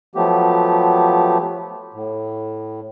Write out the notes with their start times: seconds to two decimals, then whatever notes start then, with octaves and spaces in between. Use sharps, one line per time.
0.15 F3 F#3 A3 B3 G4
1.94 A2